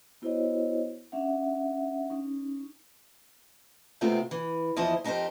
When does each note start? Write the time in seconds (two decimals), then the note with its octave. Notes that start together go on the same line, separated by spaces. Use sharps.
0.22 B3 E4 F#4 C5 C#5 D#5
1.12 C#4 D4 E5 F#5
2.10 C#4 D#4
4.01 G#2 C3 A3 B3 C4 F4
4.31 E3
4.76 E2 F3 E4 F4 C5 D#5
5.04 F2 D#4 G4 A#4 C5